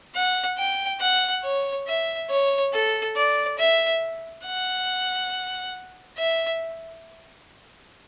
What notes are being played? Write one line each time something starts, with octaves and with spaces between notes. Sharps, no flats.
F#5
G5
F#5
C#5
E5
C#5
A4
D5
E5
F#5
E5